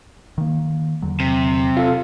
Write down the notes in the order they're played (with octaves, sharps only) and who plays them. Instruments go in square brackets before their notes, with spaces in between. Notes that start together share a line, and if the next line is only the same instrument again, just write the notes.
[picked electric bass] D#3 A#3
E2 D3 F#3
[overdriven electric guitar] C3
[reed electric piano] F4 A4